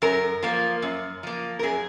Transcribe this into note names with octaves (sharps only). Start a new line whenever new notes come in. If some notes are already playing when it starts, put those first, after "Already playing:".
F#2 A#4
F3 A#3
F#2
F3 A#3
A#4
F#2 G#4